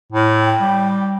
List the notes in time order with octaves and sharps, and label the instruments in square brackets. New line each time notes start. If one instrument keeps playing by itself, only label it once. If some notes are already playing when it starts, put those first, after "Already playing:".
[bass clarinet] A2
[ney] G5
[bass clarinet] G3